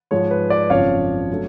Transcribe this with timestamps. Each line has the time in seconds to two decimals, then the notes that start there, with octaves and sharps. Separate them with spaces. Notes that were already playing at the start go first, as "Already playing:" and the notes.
0.11 G#2 F3 G#3 C#5
0.31 B4
0.50 B4 D5
0.70 G#1 F#2 C#3 F3 C#5 F5
1.31 F#3 A3 D4